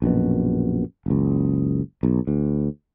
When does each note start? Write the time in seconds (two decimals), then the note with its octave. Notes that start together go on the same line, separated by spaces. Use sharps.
0.02 A#1 F#2 B2
1.06 F#1 C#2
2.03 B1
2.27 D2